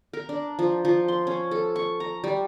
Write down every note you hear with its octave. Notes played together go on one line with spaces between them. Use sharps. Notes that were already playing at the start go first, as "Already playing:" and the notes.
A#4
D4
F3
F3
C6
C#4
A4
C#6
A#5
G3